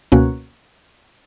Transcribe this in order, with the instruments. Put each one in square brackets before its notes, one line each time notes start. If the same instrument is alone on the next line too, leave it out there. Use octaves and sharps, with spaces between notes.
[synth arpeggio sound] C#2 B2 A#3 C#4 F#4